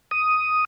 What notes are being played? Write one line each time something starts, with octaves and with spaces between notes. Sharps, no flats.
D#6